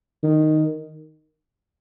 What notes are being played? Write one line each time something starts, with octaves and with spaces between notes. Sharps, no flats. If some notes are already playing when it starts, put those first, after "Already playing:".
D#3